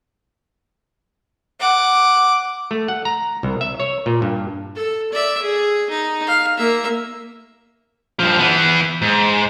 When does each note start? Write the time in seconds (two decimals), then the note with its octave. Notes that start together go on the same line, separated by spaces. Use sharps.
1.59 F#5 D6
2.71 A3
2.88 F#5
3.05 A#5
3.43 C2
3.61 E5
3.80 C#5
4.06 A#2
4.22 G2
4.76 A4
5.12 D5 E5
5.42 G#4
5.90 D#4
6.27 F5
6.57 A#3 E5
8.19 G2 F3
8.39 E3 B3
9.02 G#2